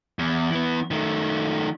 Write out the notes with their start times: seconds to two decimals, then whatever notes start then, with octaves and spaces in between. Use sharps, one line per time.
0.19 E2
0.51 E3 B3
0.91 D#3 A3